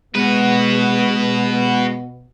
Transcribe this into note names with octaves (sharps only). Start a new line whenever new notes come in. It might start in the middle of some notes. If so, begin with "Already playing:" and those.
B2 G#3 B3 F#4 B4